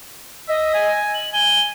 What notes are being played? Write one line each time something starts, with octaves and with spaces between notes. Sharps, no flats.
D#5 E5
G#5
F#7
G#5 G7